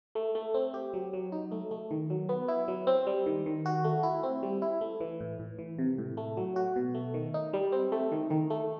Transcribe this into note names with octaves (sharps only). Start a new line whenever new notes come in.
A3
A3
C4
G4
F#3
F#3
D#4
A3
A3
D#3
F#3
B3
E4
F#3
C4
G3
D#3
D#3
F#4
A3
E4
C4
G3
E4
A3
E3
A2
A2
E3
C3
A2
A3
F#3
F#4
B2
A3
D#3
D#4
G3
C4
A3
D#3
D#3
A3